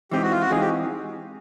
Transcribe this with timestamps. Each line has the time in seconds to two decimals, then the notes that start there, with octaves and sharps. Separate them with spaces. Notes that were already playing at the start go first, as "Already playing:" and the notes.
0.11 E3 G#3 C4 D#4 G4
0.22 F#4
0.32 F4
0.41 F#4
0.51 E3 G#3 C4 D#4 G#4
0.60 G4